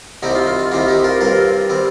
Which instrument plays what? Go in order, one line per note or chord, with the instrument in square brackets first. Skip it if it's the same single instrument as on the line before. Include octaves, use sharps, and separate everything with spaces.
[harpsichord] C2 C3 G3 C4 D#4 G4
F4
F4
F4
C2 C3 G3 C4 D#4 F4
D#4 G4
F4 A#4
G2 G3 C4 F4 A#4
G3 C4